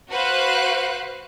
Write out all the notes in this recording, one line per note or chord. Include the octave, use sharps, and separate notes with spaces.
F#4 B4 C5 F5 F#6